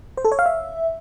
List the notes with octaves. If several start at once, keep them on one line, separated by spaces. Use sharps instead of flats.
C5
A4
C#5
F5
E5